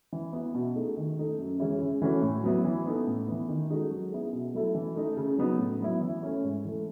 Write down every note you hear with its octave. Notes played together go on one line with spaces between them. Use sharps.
E3
B3 E4
B2
A3 D#4 G#4
D#3
A3 D#4 A4
F#2
E3 G#3 C#4 E4
C#3
E3 A3 C#4 F#4
A2
F#3 B3 E4
E3
B3 D#4 A4
A2
E3 B3
D#3
G#3 D#4 F#4 A4
F#3
B3 E4 G#4
B2
F#3 A3 E4 A4
E3
A3 D#4 A4
C#3
F#3 B3 D#4
A2
F#3 B3 E4
E3
A3 C#4 E4
G#2
E3 A3